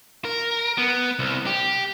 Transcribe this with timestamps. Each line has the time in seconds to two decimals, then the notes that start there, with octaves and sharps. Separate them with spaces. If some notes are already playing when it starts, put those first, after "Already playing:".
0.25 A#4
0.78 B3
1.19 C2
1.46 G4